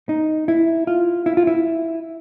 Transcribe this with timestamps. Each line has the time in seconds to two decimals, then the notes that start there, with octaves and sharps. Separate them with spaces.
0.09 D#4
0.48 E4
0.87 F4
1.26 E4
1.37 F4
1.47 E4